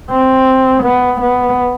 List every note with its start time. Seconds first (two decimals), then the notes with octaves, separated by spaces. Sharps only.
0.11 C4
0.84 B3
1.21 B3